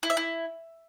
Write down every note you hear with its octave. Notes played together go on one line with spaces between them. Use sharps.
E4
E5
E4